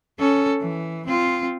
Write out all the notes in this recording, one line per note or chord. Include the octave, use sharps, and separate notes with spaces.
C#4 A4
E3
C4 F4